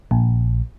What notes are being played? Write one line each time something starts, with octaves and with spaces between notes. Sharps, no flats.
A#1